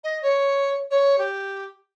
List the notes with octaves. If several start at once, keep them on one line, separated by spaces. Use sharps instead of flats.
D#5
C#5
C#5
G4